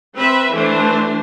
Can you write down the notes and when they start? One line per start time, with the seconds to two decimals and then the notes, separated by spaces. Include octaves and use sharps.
0.15 C4 B4 E5
0.51 E3 A3 D4 C5